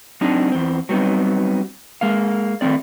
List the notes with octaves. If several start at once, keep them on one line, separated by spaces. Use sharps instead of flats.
F#3 C4 D4 D#4
E2 C4
F#3 G3 B3 C4 D#4
G#3 A#3 F5
D#3 E3 A3 C4 D5